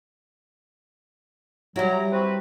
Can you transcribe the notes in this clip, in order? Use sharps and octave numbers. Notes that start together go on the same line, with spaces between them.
F#3 G3 E4 A#5
C4 F#4 B4